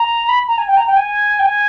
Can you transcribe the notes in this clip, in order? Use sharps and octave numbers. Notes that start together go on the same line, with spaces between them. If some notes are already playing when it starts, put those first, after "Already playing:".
Already playing: A#5
B5
A#5
G#5
G5
A#5
G5
G#5
G5
G#5